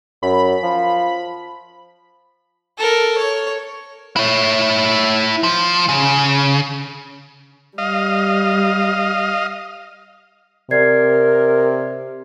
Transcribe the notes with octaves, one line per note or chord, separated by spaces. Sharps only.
F#2 B5
F3
A4 A#4
C#5
E4 C#5
F3
C#3
G3 D#5 F5
C3 A#4 D5 G#6 C7